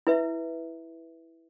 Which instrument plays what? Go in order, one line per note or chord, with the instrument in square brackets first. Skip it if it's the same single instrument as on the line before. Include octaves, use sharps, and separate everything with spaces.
[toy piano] E4 B4 E5